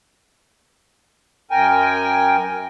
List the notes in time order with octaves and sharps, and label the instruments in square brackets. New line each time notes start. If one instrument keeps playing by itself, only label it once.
[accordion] F#2 A#4 G5 G#5